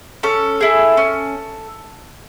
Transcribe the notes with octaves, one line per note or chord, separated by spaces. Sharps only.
C#4 A4
E4 G#4
C#4